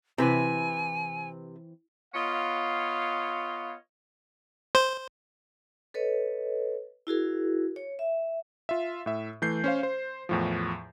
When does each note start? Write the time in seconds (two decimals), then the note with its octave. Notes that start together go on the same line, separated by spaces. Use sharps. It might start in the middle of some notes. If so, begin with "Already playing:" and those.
0.18 C3 E3 C4 E4 B4 G#5
2.14 B3 F4 C#5 D#5 F5
4.75 C5
5.94 A4 B4 C#5 D#5
7.07 E4 F#4 G#4 A#4
7.76 C#5
7.99 E5
8.69 F4 E5
9.06 A2 E5
9.42 E3 A3 G6 C7
9.64 C#4 C5 F5
9.83 C5
10.29 E2 A2 F3